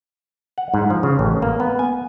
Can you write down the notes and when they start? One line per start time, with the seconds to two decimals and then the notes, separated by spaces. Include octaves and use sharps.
0.58 F#5
0.74 G#2
0.90 F3
1.03 C#3
1.19 A1
1.42 A#3
1.60 B3
1.79 G#5